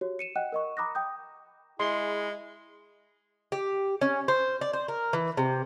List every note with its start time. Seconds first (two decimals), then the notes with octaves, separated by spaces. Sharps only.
0.01 F#4 G4 C#5
0.19 C#7 D#7 E7
0.36 D#5 F#5 G5 F#6
0.52 A#4 D#5 C#6
0.77 A#5 B5 D6 D#6 F#6 A#6
0.95 G5 D#6 G6
1.80 G#3 E4 G#4 C6
3.52 G4
4.01 C#4
4.28 C5
4.61 D5
4.73 C5
4.88 A#4
5.13 E3
5.37 C3